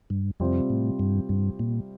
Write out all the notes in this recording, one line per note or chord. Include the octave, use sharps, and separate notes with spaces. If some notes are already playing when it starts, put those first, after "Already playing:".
G2
F2 C3 G3 C4 F4 C5
A2
G2
G2
A#2